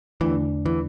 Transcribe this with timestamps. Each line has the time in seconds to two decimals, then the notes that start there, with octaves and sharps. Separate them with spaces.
0.21 E2 D3 E3 A3 D4
0.66 E3